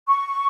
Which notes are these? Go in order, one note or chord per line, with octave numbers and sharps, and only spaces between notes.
C#6